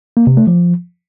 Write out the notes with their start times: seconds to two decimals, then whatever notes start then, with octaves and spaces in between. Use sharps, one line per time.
0.17 A#3
0.27 C3
0.37 A3
0.47 F3